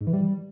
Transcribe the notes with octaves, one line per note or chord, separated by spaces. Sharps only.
G#2
E3
G3